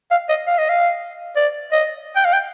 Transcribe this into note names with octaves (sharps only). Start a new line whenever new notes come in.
F5
D#5
F5
D#5
F5
D5
D#5
G5
F5
G5